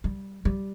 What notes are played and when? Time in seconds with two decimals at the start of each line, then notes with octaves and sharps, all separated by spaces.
0.04 G3
0.45 G3